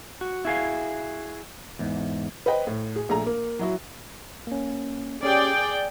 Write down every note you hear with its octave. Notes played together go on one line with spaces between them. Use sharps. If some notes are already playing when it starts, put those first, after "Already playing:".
F#4
E4 F#4 G#4 F5
E2 G#2
B4 C5 D#5 G5
A2
G#4
A#1 A3 G#4 A#5
A#3
F#3 E4 F#4
A#3 C#4
C#4 G4 G#4 D5 G5
D6